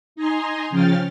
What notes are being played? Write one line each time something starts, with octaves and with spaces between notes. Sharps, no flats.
D#4 D#5 G#5 A#5 C6
C#3 F3 C#4 G5 F6 A6